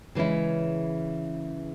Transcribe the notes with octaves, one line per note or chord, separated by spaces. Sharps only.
C#3 E3 G#3 C#4 E4